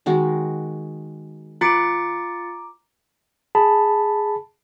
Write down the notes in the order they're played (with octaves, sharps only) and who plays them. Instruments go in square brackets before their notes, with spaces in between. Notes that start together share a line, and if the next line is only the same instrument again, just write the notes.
[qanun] D#3 G#3 F#4
[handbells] F4 A6 C#7 [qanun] B4 [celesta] A#5 D6 D7
[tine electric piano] G#4 A5 B5